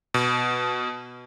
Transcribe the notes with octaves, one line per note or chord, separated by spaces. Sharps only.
B2